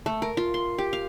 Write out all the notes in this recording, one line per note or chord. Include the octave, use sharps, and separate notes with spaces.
A3
A#4
F4
C6
G4
F5